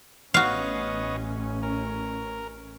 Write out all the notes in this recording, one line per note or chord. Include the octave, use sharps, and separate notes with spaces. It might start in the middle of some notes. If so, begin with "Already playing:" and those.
A1 B3 C#4 F#4 C#5 D#5 F5
A#4